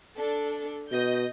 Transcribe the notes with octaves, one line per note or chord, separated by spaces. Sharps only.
D4 A4
B2 D#5 G6